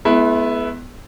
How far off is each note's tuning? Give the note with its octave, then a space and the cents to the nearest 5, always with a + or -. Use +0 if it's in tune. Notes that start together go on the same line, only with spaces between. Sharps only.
G#3 +45 B3 +0 E4 +0